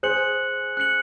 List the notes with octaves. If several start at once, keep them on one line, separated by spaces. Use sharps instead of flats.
G#4 C5 F#6 C#7 F#7
F#6 C#7 F#7